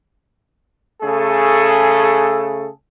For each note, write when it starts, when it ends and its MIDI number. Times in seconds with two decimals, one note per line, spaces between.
1.02 2.68 49
1.02 2.68 57
1.02 2.68 68
1.02 2.68 69